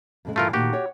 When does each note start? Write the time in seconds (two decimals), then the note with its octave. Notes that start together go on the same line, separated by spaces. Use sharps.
0.25 F2 C#3 G#3
0.36 G2 E3 A3 F4 A#4
0.53 D2 A#2 D#3 F#4 G4
0.73 C#5 F#5